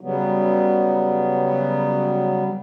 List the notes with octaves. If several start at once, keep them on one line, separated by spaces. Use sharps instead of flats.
C#3 F#3 G3 B3